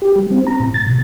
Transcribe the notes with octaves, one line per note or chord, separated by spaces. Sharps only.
G4
G3
C4
A#5
A2
A6
B2